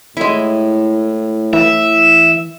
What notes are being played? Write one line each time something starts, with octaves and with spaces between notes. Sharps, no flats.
A2 G#3 E4
E3 E5